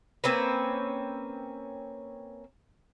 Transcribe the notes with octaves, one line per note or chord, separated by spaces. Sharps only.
A#3 C4 C#4 B4